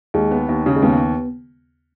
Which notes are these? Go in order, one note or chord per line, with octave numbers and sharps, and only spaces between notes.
D#2 G#3
B3
D#2
C#3
G#3
D#2 B3